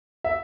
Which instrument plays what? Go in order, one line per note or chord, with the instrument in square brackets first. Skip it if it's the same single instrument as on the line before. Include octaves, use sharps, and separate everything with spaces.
[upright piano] E5